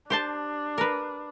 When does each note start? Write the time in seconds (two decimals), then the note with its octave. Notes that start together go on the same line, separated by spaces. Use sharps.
0.10 D4 G4 C5 A5
0.78 A#4 B4